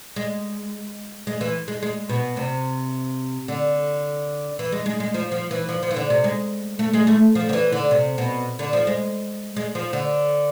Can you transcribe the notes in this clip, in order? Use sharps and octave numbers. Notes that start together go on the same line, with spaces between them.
G#3
G#3
E3
G#3
G#3
B2
C3
D3
E3
G#3
G#3
G#3
F3
F3
E3
F3
F3
E3
D3
C3
G#3
A3
G#3
A3
F3
D3
E3
D3
C3
B2
D3
F3
G#3
G#3
F3
D3